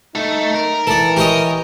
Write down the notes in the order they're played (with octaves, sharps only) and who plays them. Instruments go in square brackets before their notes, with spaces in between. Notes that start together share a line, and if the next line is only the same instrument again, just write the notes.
[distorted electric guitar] A3 A4 [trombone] D#4
[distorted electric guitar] A#4
[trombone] E3 [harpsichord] A4 D5
[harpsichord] G4 C#5 D#5